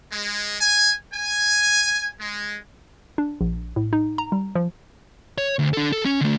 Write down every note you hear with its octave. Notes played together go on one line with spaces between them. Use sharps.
G#3
G#5
G#5
G#3
D4
A#1
A2
D#4
A#5
G3
F3
C#5
D2
D4 A4
A4
C#4
D3 A3